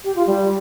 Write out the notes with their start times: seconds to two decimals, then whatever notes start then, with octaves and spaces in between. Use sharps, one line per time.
0.05 G4
0.16 F4
0.27 G3